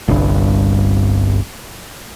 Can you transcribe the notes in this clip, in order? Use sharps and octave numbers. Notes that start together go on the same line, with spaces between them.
G1 C2 G2